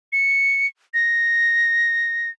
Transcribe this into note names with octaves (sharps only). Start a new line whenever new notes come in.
C#7
A#6